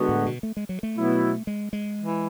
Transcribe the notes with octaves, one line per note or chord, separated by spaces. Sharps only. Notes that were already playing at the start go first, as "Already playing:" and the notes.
Already playing: D3 G#3 B3 F#4
A2
B2
A3
G#3
F#3
A3
B2 F#3 B3 E4
G#3
G#3
E3